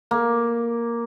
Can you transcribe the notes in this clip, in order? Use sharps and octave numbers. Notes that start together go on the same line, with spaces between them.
A#3